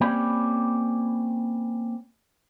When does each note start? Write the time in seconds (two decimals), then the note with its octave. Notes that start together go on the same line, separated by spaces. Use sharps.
0.01 A#3 C4 C#4 G4 D5 B5